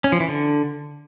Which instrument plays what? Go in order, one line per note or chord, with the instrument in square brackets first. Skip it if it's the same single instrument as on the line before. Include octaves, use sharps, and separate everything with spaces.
[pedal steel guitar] C#4
F3
E3
D3